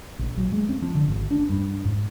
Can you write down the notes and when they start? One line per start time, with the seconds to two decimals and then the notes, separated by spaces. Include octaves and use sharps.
0.19 A#1
0.37 F#3
0.52 G#3
0.69 C4
0.82 F3
0.95 D3
1.08 G#1
1.31 D4
1.49 G2
1.85 G#2